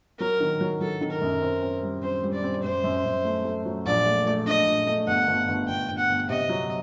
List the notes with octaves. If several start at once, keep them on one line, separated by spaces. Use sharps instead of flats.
F#3 A#4
D#3
F#3
F#3 A4
D#3
A#4
F#2
C4
C4
G3
C4 C5
G3
D5
C4
F#2 C5
F#2
F#2
A3
A3
F#3
A#1 D5
A3
A3
D4 D#5
A#1
A3
G1 F#5
G1
G1
G1 G5
G1
F#5
G1
C3 D#5
F#3